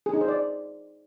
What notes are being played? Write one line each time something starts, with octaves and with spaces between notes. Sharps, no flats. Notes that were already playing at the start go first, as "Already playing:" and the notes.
G#4
D#4
C5
D5